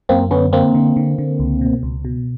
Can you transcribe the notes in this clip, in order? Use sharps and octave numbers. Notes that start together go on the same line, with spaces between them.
F#2 A#3 C4
D3 B3 C#4
D3 A#3 C4
D3
D3
D3
C#2
B2
C#2
B2